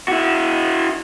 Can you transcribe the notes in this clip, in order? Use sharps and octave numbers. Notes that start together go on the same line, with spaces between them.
E4 F#4